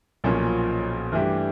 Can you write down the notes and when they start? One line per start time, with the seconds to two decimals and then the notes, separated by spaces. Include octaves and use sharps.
0.24 B1 A#2 F3 A#3 C#4
1.12 G2 E3 A3 D4 G4